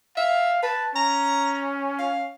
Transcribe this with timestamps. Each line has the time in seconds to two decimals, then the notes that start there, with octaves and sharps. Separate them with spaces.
0.17 E5 F5
0.63 B4 A5
0.96 C#4 A#5
1.99 F5